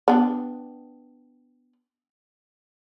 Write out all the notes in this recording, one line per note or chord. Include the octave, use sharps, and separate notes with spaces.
B3 D4 G4